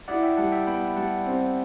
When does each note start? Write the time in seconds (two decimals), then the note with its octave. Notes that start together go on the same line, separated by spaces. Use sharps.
0.08 E4 D5 F#5
0.23 E5 G5
0.37 G3 F#5 A5
0.52 E5 G5
0.67 B3 G5 B5
0.96 G3 F#5 A5
1.26 C4